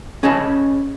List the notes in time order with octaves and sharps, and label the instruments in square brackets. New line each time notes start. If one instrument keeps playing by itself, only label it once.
[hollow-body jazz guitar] C#4 G#4 D#5 A5 B5